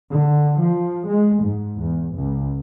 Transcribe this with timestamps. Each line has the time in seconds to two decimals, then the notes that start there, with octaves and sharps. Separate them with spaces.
0.11 D3
0.60 F3
1.09 G#3
1.43 G#2
1.78 E2
2.15 C#2